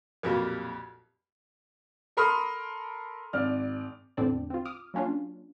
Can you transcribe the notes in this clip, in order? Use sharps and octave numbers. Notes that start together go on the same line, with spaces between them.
B1 F2 A#2 F#4 G4 A#4
A4 A#4 B5 C6 D#6 F6
G#1 D5 F6
E2 A2 D3 C4 D4 D5
C4 F4
D6 D#6 F6
F#3 A#3 C#4 D4 F4